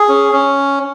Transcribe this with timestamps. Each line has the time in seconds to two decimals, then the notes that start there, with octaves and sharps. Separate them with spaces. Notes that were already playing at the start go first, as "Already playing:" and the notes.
Already playing: G#4
0.09 C#4
0.33 C#4